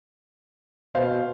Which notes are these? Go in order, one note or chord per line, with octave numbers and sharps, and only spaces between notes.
B2 C5 F5